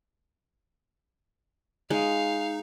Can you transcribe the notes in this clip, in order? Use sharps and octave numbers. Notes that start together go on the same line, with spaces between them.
G#3 D#4 F5